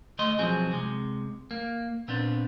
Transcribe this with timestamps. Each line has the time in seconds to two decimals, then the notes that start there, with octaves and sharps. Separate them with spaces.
0.19 D2 A3 D#5 C6
0.39 B1 F3 F#3 C4 G#4
0.72 C3 G#3
1.51 A#3
2.08 A#2 B3 C4 D4